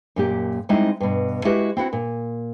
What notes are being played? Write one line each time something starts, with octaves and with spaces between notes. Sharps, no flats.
F#2 A#2 G4
G3 G#3 C4 D#4 E4
G2 B2
G#3 E4 F#4 G4 B4
C4 E4 F#4 F#5
A#2